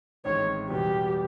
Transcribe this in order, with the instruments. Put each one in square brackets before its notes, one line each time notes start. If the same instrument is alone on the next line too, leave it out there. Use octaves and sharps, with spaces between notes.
[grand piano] A1 G#2 D#3 G#3 C4 [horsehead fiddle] C#5
[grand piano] E2 B2 G3 B3 [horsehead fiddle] G4